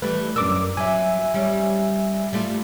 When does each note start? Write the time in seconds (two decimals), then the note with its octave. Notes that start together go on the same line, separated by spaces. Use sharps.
0.02 E3 G3 A3 B4
0.36 F#2 D4 A#4 D6 E6
0.77 F#3 E5 G#5
1.34 G3 C#4
2.33 G3 A3 F4